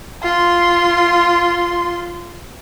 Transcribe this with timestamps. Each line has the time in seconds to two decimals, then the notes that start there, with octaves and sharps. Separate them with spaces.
0.23 F4 C6